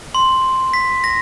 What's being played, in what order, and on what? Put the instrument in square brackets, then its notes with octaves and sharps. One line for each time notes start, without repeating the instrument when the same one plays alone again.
[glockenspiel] C6
B6
A#6